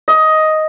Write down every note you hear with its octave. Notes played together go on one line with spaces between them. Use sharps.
D#5